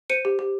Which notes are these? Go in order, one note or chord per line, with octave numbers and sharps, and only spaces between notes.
C5 C#7 D#7
G4
G4